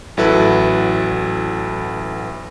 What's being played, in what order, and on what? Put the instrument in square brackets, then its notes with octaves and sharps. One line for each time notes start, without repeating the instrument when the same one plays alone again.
[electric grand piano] A1 F#3 E4 A4 B4